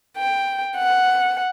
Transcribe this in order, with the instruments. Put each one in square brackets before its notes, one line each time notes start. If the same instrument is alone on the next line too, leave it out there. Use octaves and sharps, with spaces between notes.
[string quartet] G5
F#5